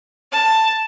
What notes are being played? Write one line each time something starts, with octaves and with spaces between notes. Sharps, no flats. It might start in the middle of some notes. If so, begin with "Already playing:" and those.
A5